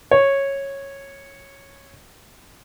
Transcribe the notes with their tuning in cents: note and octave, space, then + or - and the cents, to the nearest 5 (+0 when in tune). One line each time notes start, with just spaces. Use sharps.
C#5 -10